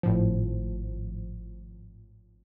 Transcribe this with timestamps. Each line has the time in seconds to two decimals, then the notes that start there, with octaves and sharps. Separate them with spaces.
0.03 G#1 A2 F3